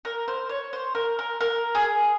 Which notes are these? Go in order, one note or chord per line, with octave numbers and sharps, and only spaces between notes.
A#4
C5
C#5
C5
A#4
A#4
A#4
G#4